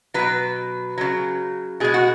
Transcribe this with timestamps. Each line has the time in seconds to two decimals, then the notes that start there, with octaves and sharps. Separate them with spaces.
0.14 B2 F#3 B4
0.98 C#3 F#3
1.80 B2 G#3 G#4
1.94 F#4